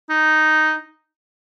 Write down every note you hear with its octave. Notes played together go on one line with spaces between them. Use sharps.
D#4